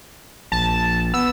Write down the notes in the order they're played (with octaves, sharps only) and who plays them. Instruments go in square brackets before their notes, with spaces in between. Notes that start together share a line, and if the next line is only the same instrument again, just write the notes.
[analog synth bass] A#1 [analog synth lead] A5
[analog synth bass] B3 [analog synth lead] E6